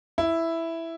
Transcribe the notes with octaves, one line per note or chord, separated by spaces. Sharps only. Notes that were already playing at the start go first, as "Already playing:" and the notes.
E4